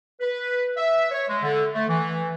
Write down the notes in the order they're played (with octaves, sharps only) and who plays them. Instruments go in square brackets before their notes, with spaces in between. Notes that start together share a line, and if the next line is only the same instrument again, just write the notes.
[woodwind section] B4
E5
C#5
G#3
D3
A3
E3